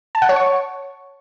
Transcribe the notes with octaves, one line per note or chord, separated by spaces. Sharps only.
A5
F#5
C#5
C#6